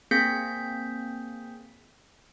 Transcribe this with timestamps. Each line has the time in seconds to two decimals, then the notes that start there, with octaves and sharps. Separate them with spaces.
0.11 A#3 C4 G#4 G6 B6